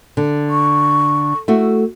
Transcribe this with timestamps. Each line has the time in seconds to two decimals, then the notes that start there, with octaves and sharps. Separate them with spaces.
0.17 D3
0.50 C#6
1.48 A3 E4 F#4